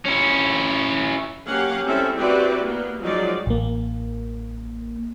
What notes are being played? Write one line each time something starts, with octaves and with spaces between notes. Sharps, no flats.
C#4 E4
F#3 A#3 C#4 G4 F5 F#5
G3 C4 C#4 E4 A4 E5
C4 E4 F#4 G4 B4 D5
A#3 B3
F3 F#3 G#3 C4 D#4 D5
A1 A#3